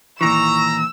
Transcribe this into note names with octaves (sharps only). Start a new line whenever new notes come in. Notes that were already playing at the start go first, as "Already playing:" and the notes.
A#2 D#3 E3 A#5 C#6 E6